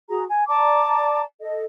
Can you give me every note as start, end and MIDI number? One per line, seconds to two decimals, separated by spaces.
0.09 0.24 66
0.09 0.24 68
0.09 0.24 82
0.29 0.44 80
0.48 1.23 74
0.48 1.23 81
0.48 1.23 82
0.48 1.23 86
1.40 1.63 69
1.40 1.63 75